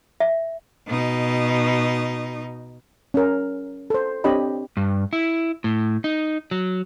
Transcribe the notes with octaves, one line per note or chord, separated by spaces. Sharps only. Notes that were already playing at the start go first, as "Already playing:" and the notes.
E5
B2 D#4
C#4 A#4
A4 C5
C4 D4 G4 C#5 D#5 B5
G2
E4
A2
D#4
F#3